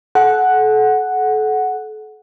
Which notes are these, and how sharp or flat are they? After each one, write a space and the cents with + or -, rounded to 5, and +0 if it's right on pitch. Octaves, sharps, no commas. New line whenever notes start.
A4 -35 F#5 +0